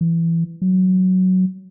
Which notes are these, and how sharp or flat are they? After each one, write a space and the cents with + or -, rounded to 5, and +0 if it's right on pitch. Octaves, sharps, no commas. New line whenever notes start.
E3 +15
F#3 +5